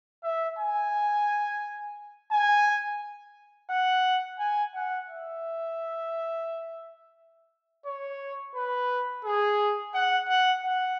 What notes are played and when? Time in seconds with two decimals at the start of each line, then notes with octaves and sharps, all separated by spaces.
0.24 E5
0.59 G#5
2.32 G#5
3.70 F#5
4.39 G#5
4.74 F#5
5.09 E5
7.86 C#5
8.55 B4
9.25 G#4
9.94 F#5
10.28 F#5
10.63 F#5